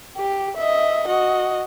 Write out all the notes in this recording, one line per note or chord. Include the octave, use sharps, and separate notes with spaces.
G4
D#5 E5
F#4 D#5